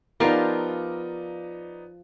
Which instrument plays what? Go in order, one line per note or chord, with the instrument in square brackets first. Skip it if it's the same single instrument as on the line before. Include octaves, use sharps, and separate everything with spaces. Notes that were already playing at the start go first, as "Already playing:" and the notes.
[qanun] F3 F5 [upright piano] B3 D#4 D5 [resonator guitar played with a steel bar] F4 G4 A#4